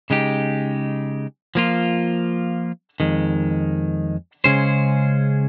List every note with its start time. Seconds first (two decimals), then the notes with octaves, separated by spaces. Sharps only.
0.10 C#3 G#3 D#4 G4
1.55 F3 A#3 F4
3.00 F2 D#3 G#3
4.44 C#3 G#3 C#4 G#4 C5